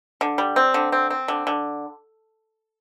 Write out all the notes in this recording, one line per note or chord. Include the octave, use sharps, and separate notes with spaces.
D3
G3
C4
D3
C4
C4
D3
D3